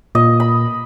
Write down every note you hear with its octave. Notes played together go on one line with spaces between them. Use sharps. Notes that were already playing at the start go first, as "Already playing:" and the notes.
A#2 D#5
B5